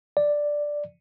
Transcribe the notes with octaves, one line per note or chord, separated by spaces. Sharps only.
D5